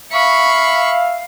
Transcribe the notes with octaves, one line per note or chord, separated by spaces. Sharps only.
E5 F5 B5 C#6